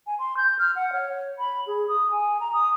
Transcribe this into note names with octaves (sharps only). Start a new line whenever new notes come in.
G#5
C6
G6
F6
F#5
C#5
B5
G#4
D#6
G#5
A#5
D#6